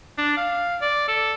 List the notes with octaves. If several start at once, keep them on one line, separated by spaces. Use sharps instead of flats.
D4
F5
D5
A4